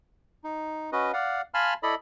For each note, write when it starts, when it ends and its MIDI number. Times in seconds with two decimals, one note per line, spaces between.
0.44 0.90 63
0.92 1.12 61
0.92 1.12 66
0.92 1.12 71
0.92 1.12 75
1.13 1.42 74
1.13 1.42 77
1.13 1.42 78
1.54 1.74 77
1.54 1.74 80
1.54 1.74 81
1.54 1.74 83
1.54 1.74 84
1.54 1.74 89
1.83 1.95 64
1.83 1.95 69
1.83 1.95 74
1.83 1.95 75
1.83 1.95 83